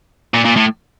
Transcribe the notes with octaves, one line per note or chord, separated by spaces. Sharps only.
A#2
A#2
A2